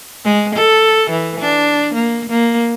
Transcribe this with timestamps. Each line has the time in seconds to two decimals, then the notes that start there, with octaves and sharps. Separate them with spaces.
0.24 G#3
0.55 A4
1.10 E3
1.40 D4
1.94 A#3
2.30 A#3